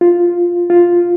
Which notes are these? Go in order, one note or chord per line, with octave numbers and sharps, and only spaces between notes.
F4
F4